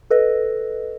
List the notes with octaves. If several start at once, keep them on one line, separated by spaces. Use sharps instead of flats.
A4 B4 D#5